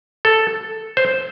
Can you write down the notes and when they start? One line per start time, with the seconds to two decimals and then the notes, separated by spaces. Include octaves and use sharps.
0.25 A4
0.97 C5